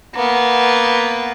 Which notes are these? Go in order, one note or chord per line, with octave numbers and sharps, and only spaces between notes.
A#3 B3